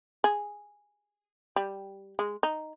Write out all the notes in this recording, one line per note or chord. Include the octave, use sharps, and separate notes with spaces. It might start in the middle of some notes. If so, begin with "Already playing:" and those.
G#4
G3
G#3
D#4